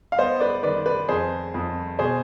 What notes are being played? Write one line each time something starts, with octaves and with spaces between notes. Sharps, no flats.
F5
B3 C5 D#5
B4 D5
D#3 B4 D5
B4 D5
F2 G#4 C5
F2
B2 G#4 C5